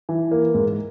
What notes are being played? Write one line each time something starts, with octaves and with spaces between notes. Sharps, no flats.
E3
A#3
G#2